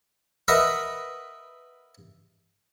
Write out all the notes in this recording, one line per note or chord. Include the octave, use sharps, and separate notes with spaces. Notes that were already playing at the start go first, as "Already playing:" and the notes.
A#4 B4 D#5 E5 F#5 B5